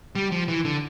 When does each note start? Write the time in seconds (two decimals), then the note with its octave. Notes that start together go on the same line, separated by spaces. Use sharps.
0.15 G3
0.32 F3
0.48 E3
0.65 D3